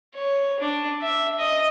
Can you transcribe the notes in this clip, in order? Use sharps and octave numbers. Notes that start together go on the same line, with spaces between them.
C#5
D4
E5
D#5